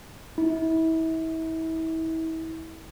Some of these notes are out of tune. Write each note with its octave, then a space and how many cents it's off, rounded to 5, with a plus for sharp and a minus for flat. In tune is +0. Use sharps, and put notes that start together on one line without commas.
E4 -35